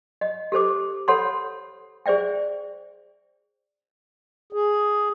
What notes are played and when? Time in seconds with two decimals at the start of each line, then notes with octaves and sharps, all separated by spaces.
0.21 D#5
0.52 G4 A4 C5 D6
1.08 A4 C5 C#5 F#5 B5 C6
2.06 G#4 C5 D5 E5 G5
4.53 G#4